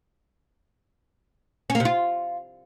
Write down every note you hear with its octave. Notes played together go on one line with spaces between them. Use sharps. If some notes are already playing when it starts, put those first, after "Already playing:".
C#4
A#3
C3
F4